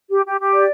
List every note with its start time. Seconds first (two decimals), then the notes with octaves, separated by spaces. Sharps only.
0.10 G4
0.25 G4
0.40 G4
0.53 D5